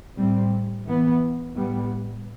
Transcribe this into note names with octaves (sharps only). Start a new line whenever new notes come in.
A2 G3 C4
E3 B3
A2 G3 B3